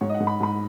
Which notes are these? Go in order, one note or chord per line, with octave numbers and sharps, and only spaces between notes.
G#2 C#5
D#5
F#5
G#2
B5
G#2 B5